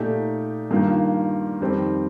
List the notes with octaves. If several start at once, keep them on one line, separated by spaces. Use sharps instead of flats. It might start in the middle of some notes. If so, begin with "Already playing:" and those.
Already playing: A#2 A3 D#4 G4
G2 D#3 A#3 F4
F2 D#3 G3 C4